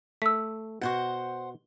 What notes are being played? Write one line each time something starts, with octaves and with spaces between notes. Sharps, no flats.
A3 E6 B6
B2 F#4 C5 F#5